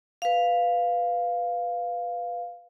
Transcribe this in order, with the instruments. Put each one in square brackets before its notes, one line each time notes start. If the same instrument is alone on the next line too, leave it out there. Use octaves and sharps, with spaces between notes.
[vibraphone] B4 F5